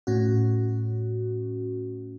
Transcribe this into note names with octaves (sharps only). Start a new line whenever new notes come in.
A2 C#4 F#4